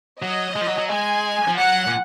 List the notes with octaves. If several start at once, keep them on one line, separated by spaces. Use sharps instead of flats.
F#3 D#5
G#3
F3
F#3
F#3
G#3 G#5
F3
F#3 F#5
A#2